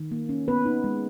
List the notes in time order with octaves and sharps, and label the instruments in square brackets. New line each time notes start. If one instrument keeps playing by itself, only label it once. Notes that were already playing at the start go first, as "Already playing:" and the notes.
Already playing: [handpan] D#3
A#3
C#4
B3 B4
D#4
G#3